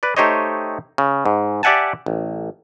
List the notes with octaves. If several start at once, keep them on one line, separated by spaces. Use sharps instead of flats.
B4 D5
A3 D#4 G4 C5 C#5 D#5
C#3
G#2
G4 D5 E5 F#5 G#5 A5
A1